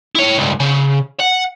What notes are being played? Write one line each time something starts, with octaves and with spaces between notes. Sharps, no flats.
E4 C#5
C#2 G2
C#3
F#5